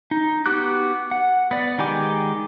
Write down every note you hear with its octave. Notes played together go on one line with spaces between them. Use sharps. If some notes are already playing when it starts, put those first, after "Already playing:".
D#4
B3 F#4 G4 D6 F#6
F#5
B3 D5
D#3 G#3 G4 G#5 D6